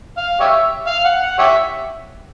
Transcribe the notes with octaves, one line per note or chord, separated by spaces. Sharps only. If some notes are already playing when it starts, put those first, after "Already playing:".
F5
G4 C#5 E5
F5
F#5
F#5
G4 C#5 E5